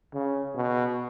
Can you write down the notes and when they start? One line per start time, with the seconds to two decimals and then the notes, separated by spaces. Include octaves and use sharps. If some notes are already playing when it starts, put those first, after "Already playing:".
0.14 C#3
0.55 B2